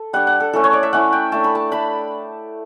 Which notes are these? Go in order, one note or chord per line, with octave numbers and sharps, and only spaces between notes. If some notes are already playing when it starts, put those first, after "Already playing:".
Already playing: A4
G3 D4 F#5
F#5
A4
A3 C#4 E4 A4
C#5
D5
E5
A3 C#4 E4 F#5
G5
A3 D4 A5
B5
A5
A3 D4 B5